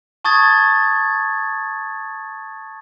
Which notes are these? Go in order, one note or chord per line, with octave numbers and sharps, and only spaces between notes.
A5 C#6 D#6 G#6 A6